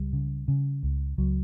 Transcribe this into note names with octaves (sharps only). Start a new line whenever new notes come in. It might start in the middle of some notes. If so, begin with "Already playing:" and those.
Already playing: C#2 G3
C#3
C#3
C#2
C#2 F#3